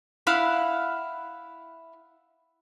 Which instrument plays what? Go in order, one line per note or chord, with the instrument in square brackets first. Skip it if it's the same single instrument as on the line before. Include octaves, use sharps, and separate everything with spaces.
[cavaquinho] E4 F5 F#5 B5